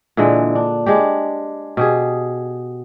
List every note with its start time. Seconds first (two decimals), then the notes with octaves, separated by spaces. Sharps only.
0.17 A#2 D3 E3 G#3
0.55 D4
0.86 G#3 D4 G4
1.77 B2 G4 G#4